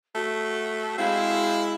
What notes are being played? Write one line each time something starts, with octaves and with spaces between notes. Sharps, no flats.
A3 F#4
G#3 C4 E4 F5